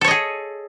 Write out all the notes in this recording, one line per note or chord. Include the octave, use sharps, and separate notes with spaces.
G#4 A4 C#5 D#5